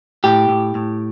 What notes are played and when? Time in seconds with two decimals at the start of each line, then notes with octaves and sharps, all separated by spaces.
0.24 A2 G4
0.49 A2
0.75 A2